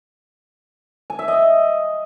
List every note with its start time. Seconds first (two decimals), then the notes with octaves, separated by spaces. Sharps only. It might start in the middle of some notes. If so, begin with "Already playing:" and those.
1.10 G#5
1.19 E5
1.28 D#5